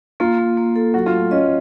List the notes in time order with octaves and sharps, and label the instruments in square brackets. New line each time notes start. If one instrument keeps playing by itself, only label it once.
[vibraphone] A#3 [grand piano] F4
[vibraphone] A#3
A#3
A4
[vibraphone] F#3 [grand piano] F#4
[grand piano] F4
[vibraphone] A3
[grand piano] C#4 [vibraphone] D#5